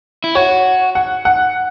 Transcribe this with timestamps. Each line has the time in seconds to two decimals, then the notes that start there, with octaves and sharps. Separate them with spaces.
0.24 E4
0.35 F#4 C#5
0.95 F#5
1.25 F#5